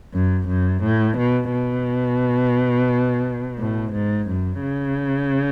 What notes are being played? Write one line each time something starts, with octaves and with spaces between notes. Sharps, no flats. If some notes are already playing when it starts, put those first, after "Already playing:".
F#2
F#2
A2
B2
B2
A2
G#2
F#2
C#3